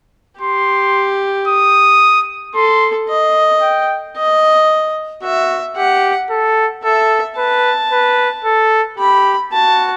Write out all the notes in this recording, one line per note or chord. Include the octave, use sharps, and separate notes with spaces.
G4 C6
D#6
A4 C6
D#5
G5
D#5
F#4 E5
G4 F#5
A4
A4 E5
B4 A5
B4
A4
G4 B5
F#4 A5